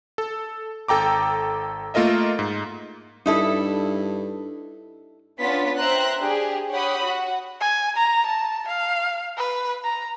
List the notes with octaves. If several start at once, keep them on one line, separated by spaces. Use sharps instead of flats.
A4
G#1 A4 G5 A#5 D6
A3 A#3 F4 A#4 D#5 E5
G#2
G2 D#4 E4 A4
B3 C#4 D4 F4 A6 B6
C5 E5 G5 A#5 C6 F#6
D4 G4 G#4
G4 C#5 F#5 B5 D#6
F#4 F#5
G#5
A#5
A5
F5
B4
A#5